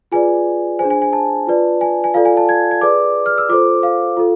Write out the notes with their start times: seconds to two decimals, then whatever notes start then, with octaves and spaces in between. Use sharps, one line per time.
0.12 F4 G#4 B4 D5 G#5
0.79 C5 G#5
0.82 D4 G#4
0.90 G#5
1.02 G#5
1.13 A5
1.47 F4 B4 D5
1.81 G#5
2.04 G#5
2.14 F4 A4 D5 F5
2.25 G#5
2.37 A5
2.49 G#6
2.71 G#6
2.81 G#4 B4 D5 D6
3.26 F6
3.38 E6
3.49 F4 A4 C5 D6
3.83 F5
4.17 F4 A4